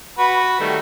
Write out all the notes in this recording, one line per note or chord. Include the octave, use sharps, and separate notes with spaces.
F#4 B4 B5
D#3 G3 A3